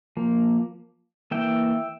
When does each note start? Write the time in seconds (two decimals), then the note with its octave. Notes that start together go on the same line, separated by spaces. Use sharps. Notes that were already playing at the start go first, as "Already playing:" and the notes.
0.17 F3 A#3
1.31 E3 A#3 E5 G5